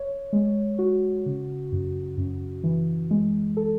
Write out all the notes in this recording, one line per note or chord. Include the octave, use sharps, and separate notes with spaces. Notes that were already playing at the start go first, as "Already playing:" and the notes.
Already playing: C#5
G#3
F#4
C#3
F#2
F#2
E3
G#3
A4